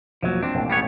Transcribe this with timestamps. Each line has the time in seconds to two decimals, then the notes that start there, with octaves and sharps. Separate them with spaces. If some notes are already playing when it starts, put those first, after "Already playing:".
0.23 E1 F3 F#3 A#3
0.43 C4 D4
0.54 E1 A1 A#3
0.70 G3 B3 C#5